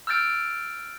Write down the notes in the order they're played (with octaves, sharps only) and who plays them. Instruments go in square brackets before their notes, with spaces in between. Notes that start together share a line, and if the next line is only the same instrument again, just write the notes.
[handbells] E6 F6 G6 A6 D7